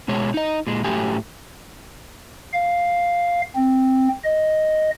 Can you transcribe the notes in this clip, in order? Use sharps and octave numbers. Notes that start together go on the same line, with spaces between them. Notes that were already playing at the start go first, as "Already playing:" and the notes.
B2 G#3 G#4 C#5
D#4 D#5
A#2 G#3
A2 F#3 A3 G4 G#5
F5
C4
D#5